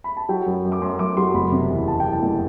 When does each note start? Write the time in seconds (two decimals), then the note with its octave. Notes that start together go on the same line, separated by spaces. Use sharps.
0.04 B5
0.17 A5
0.29 F#3 G5
0.46 F#2
0.65 F#2
0.72 D6
0.82 F#2 C6
0.99 F#2 D6
1.17 F#3 C6
1.34 F#1 B5
1.52 C3
1.70 E2
1.87 E2 A5
2.00 G5
2.05 E3
2.12 A5
2.23 F#1